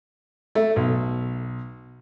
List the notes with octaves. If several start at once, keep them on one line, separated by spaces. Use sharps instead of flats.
A3
B1